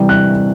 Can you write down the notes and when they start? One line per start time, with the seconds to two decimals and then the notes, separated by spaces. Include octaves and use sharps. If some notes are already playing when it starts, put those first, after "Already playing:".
Already playing: C3 E3 G3
0.09 F#6